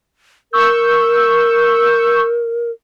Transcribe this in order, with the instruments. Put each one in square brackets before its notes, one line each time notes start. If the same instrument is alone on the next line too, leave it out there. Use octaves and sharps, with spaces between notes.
[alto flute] A#4 [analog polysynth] C#6 E6 G6